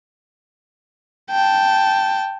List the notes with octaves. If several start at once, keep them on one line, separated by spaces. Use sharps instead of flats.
G5 A5